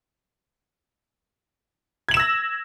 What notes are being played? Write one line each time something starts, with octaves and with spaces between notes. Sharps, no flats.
E6 G#6 A#6 E7 F#7